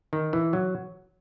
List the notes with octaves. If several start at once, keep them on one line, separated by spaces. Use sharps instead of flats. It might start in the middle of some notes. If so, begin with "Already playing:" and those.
D#3
E3
F#3